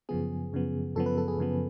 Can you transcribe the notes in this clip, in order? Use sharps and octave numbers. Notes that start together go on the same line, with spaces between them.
F#2 C#3 F3 B3 G#4
F#2 C#3 F3 B3
F#2 C#3 F3 B3 A4
B4
A4
G#4
F#2 C#3 F3 B3